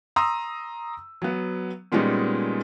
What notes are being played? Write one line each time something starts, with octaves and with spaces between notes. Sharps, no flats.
A#5 C6 D#6 E6
F#3 B3
A#2 G3 G#3 B3 C#4 D#4